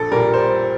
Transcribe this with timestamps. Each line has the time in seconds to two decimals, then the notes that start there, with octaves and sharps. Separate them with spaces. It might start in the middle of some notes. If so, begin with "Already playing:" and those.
Already playing: A#1 A4
0.11 A#2 G3 A#4
0.34 C5